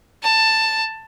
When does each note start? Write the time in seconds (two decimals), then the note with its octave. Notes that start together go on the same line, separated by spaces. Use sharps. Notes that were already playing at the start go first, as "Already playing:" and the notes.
0.23 A5